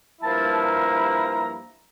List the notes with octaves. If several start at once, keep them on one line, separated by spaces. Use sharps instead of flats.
G2 F3 A#3 E4 A5
A#5